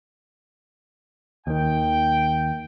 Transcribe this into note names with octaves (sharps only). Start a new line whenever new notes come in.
D#2 D#3 G5